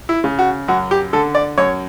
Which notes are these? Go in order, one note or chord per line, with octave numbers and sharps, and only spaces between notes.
E4
C#3
F#4
F#2 F#4
G4
D3 A4
D5
F#2 C#5